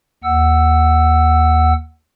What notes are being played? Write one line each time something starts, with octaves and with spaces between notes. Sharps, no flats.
D#2 F#5 E6